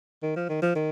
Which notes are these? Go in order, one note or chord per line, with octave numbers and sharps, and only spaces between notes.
D#3
F3
D#3
F3
D#3